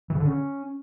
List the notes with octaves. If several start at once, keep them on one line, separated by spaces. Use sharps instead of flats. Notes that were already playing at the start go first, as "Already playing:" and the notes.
E3
C#3
D3
C#4